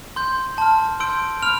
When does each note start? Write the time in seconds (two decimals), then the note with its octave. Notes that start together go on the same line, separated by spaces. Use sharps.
0.16 C6 G6
0.58 A5 C6 F6
1.00 C6 E6 G6 D7
1.43 B5 F6 F7